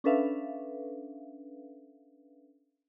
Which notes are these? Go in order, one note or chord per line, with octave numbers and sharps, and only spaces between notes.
C#4 D4 A4 B4 E5 F5